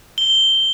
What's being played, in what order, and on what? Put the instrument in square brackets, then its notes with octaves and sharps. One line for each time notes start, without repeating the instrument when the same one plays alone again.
[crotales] G7